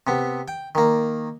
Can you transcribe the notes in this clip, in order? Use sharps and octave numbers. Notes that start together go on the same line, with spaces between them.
C3 B3
G5
D#3 A#3